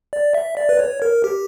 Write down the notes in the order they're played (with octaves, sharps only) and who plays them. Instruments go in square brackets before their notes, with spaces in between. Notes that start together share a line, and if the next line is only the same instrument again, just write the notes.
[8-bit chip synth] D5
E5
D5
B4
C#5
A#4
G4